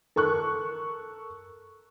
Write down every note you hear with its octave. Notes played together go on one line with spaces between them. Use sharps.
A4 A#4 C#6 F#6